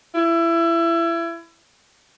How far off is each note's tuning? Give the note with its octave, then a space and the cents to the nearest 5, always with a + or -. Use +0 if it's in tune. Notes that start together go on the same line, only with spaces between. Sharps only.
E4 +25